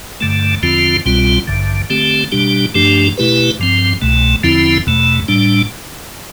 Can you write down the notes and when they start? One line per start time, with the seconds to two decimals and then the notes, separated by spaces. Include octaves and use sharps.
0.21 G2 D3 A3
0.62 E2 D3 F3 C4 F4
1.05 C2 B2 G3 C4 F4
1.48 A1 G2 D3
1.90 D3 A3 C4 G4
2.32 B2 G3 D4 G4
2.75 G2 F3 A3 D4 G4
3.17 B2 A3 E4 G4 B4
3.60 G2 F3 C4
4.02 C2 B2 A3
4.44 E2 D3 F3 C4 E4
4.87 E2 B2 A3
5.28 A2 G3 D4